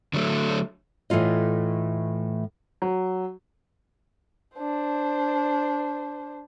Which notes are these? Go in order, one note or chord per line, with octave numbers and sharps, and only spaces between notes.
D3 F#3 A3
A2 E3 A3 F4 D#5
F#3
D4 C5